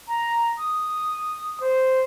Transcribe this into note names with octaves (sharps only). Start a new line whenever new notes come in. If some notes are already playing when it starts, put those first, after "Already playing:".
A#5
D#6
C5